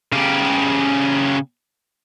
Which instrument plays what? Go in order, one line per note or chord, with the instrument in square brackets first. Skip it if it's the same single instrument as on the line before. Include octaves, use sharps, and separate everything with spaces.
[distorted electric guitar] C#3 G4